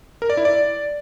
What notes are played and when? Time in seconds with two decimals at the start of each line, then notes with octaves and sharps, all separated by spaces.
0.22 A#4
0.30 D5
0.37 E4
0.45 D5